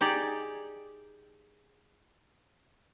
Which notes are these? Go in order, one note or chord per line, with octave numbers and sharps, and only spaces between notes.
D#4 G4 G#4 D5